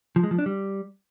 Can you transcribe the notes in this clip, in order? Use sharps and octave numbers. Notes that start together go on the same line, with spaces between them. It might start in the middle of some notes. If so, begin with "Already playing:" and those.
F3
G#3
F3
D4
G3